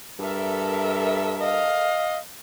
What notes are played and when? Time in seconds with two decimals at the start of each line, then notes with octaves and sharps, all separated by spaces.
0.19 G2 A4 A#4 E5
1.41 D#5 F5